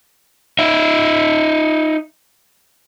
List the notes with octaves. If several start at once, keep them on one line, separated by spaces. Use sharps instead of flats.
D#4 E5